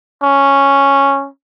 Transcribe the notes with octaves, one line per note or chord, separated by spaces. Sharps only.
C#4